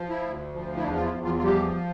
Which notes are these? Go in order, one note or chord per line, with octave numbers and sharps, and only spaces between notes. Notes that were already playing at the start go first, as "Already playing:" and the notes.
Already playing: F3
E4
D2
F3
E4
E2 D4
F4
E4
E2
F3 F4
F4
F3 G3 G4